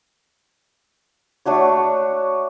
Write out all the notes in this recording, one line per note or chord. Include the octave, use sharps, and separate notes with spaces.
A3 D4 F#4 C#5